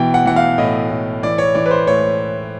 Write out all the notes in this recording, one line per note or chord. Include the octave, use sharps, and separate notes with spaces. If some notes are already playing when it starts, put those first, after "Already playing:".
Already playing: B2 E3 G5
F#5
E3 F#5
F5
A2 D#5
A2
E3 D5
C#5
E3 D5
B4
C5
A2 C#5